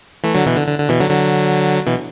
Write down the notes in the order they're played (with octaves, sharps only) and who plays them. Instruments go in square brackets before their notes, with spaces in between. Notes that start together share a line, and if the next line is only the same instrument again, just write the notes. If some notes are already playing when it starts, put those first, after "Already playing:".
[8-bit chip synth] E3 A3
D3 F#3
B2 E3
D3
D3
D3
B2 E3
D3 F#3
D3 F#3
B2 E3